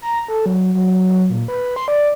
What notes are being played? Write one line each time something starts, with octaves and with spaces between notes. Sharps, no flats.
A#5
A4
F#3
F#3
F#3
A#2
B4
C6
D5